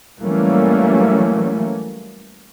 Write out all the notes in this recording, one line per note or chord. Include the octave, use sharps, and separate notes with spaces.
E3 F#3 G3 A3 A#3 C#4